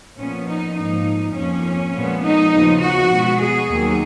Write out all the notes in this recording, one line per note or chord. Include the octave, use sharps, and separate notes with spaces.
A#2 F3 B3 C#4
D#4
G#2 F3 A#3 D#4
F2 F3 A#3 C#4
A#2 F3 G#3 B3
D#4
D#2 C#3 F3 B3
F#4
B2 G#3 B3
G#4
D#2 D#3 F#3